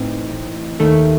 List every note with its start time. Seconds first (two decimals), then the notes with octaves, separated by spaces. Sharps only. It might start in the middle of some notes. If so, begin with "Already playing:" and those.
Already playing: A2 E3 C4 D#4
0.80 D#2 D#3 A3